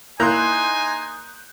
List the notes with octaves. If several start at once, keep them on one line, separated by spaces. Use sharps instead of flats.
A#3 D#4 E4 G#5 A#5 C6 F#6 G6